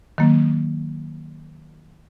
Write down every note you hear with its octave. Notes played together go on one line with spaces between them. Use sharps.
D#3 F#3 A#3